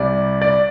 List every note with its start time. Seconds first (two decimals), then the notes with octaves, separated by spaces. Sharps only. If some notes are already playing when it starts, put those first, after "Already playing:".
Already playing: C2 C3 G3 D5
0.42 D5